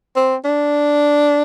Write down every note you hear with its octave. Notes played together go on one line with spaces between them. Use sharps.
C4
D4